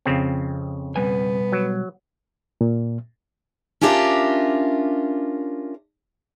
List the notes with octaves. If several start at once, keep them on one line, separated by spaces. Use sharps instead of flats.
F2 C#3 C4
B2 G3 B3 G#5
F#3
A#2
C#4 D4 F4 G4 A#4 E5